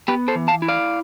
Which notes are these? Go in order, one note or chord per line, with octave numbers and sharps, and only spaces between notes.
B3 G4 B4
A4 C5
E3
F5 A5
E4
D5 F5